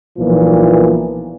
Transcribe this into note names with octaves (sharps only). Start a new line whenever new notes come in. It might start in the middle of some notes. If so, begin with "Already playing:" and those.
B1 A#2 E3 F3